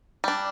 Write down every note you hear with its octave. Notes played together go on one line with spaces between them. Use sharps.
G3 D4